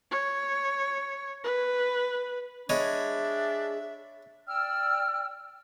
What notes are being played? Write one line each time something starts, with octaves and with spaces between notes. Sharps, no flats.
C#5
B4
G#3 D4 C#5 E5 B5
D5 G5 E6 F6